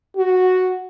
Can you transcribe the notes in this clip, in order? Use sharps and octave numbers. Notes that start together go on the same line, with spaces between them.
F#4